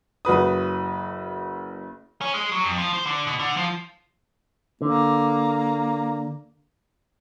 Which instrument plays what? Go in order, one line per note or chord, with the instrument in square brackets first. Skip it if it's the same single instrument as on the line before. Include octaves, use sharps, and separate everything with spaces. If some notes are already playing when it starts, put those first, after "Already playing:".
[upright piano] F#1 F#4 B4 D#6
[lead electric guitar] C#4
G#3
F#3
F2
F3
C5
D3
B2
D3
F3
[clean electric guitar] D3 [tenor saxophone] A#3